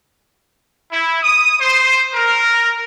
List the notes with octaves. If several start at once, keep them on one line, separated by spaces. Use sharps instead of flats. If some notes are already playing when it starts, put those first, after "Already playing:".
E4
D#6
C5
A#4